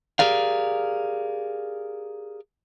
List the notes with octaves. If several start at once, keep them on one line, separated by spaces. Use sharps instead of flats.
G4 G#4 A#4 D5 F5